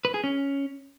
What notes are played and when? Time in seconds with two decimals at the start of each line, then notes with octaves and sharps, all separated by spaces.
0.05 B4
0.14 G#4
0.24 C#4